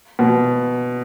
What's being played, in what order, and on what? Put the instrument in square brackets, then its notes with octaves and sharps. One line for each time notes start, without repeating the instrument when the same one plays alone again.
[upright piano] B2